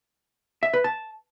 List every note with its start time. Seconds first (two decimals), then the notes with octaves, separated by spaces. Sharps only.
0.63 E5
0.73 B4
0.84 A5